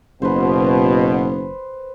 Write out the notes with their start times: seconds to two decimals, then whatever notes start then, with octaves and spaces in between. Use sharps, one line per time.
0.22 F#1 B2 B4 C5